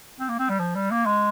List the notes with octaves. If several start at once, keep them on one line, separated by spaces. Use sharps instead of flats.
C4
A#3
C4
G3
F3
G3
A#3
G#3